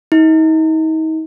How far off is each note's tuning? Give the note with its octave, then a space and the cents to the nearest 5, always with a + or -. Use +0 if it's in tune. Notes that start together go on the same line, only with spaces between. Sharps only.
D#4 +35